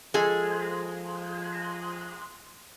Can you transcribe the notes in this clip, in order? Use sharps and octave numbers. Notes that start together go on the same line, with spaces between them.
F3 G#3 G#4 A4 G#5